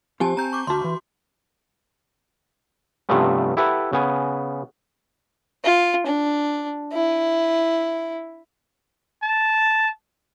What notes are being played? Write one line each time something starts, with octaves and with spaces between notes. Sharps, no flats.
F3 C4 F4 G4 G#5 A5
C4 A#5 G6
C#6 D6
D2 F#4 A5 C6
E3
G2 C3 F3 A3 B3 C#4
E4 G4 A4 B4 E5 F#5
C#3 B3 G#5
F4
D4
E4
A5